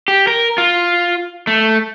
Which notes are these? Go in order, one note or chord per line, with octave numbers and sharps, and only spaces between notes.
G4
A#4
F4
A3